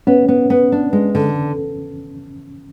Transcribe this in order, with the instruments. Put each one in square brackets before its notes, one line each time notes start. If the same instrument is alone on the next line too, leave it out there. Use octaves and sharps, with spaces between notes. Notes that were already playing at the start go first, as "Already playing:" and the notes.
[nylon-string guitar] B3 [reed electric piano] C#4
[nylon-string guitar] B3
B3
D4
G#3
D3